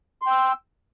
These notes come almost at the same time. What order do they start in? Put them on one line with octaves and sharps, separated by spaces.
C6 G5 E6